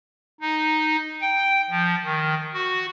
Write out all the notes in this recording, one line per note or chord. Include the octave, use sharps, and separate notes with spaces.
D#4
G5
F3
D#3
F#4